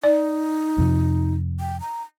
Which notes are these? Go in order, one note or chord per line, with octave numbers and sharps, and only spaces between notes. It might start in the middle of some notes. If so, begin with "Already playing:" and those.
D#4 D5
F2 C3 F3
G5
A#5